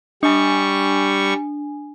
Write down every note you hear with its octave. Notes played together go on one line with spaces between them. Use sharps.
G3 D4 G#5 C#6